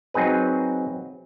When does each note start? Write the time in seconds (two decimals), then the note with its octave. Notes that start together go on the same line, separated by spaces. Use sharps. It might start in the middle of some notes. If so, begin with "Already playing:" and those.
0.14 F#3 C4 D#4 G#4 B4